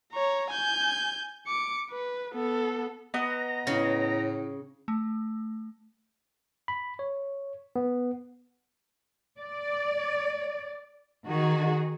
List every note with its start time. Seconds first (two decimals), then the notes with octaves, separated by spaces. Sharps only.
0.12 C#5 A#5
0.51 G#5 G6
1.47 D6 C#7
1.91 B4
2.33 B3 A4
3.14 B3 D#5 A#5
3.67 A2 C#3
4.88 A3
6.68 B5
6.99 C#5
7.76 B3
9.39 D5
11.26 D#3 F#4 G#4